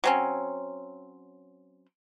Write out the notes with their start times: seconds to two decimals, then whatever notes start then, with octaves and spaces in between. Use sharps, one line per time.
0.04 F#3 C4 C#4